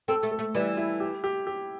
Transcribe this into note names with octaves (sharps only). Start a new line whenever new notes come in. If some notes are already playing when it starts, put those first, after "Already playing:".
C4 A4
A3
A4
A3
E3 G3
E4
G4
G4
G4